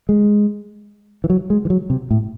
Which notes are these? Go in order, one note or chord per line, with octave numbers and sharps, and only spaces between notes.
G#3
E3
F#3
G#3
E3
F#3
C3
A2